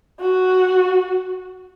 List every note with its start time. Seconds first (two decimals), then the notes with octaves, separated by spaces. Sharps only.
0.20 F#4